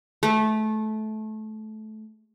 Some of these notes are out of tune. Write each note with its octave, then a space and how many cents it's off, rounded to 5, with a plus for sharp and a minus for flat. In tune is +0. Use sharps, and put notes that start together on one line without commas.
A3 -20